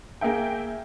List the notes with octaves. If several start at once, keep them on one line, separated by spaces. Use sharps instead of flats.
A#3 G#4 E5 G5